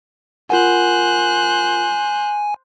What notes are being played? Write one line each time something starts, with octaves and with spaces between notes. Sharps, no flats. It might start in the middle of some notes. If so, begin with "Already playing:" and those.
F4 A#4 C5 F#5 G#5 F#6